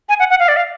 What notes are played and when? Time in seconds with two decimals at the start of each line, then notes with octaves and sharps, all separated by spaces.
0.09 G#5
0.19 F#5
0.30 F#5
0.39 F5
0.48 D5
0.57 F5